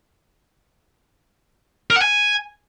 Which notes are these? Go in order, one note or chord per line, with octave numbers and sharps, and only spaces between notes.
A#4
F#5
G#5